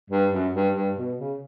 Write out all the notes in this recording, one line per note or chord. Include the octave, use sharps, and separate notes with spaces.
G2
F#2
G2
G2
B2
C#3